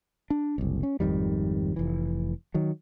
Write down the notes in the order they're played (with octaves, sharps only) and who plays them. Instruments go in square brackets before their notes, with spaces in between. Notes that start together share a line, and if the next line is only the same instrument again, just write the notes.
[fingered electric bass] D4
F#1 C2
C#4
G#1 F2 D#3 G3
F1 E3
D#3 F#3